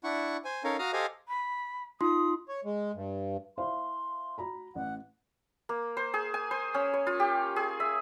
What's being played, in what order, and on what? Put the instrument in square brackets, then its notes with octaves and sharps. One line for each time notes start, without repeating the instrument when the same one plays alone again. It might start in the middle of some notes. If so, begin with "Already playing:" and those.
[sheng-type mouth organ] D4 E4 F#5 C#6
C5 G#5
C#4 D#4 A4 A#4 C#5 F5
F#4 F5 A#5 D#6 F6
G4 A4 C5 D#5 F5 G#5
[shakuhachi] B5
[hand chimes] D#4 F4 C6 [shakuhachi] D#6
[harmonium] C#5
G#3
G2
[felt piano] E4 C5 F5 [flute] C6
[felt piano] F#4 A#5 B5
[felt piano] A1 [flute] F#5
[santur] A#3
C5
G#4
G#5
C5
C#4
C#5
F4
G4
G#4
E5